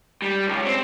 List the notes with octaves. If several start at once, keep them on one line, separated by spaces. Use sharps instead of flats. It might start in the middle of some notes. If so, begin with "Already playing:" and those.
G3
C#2
C4